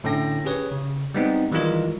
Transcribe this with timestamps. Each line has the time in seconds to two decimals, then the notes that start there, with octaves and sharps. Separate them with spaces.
0.04 A2 D3 C#4 G5 A#6
0.45 C#4 G4 G#4 B4 C#5
0.72 C#3
1.14 G3 G#3 B3 C4 D#4
1.51 D#3 E3 G3 G#3 F4 A#4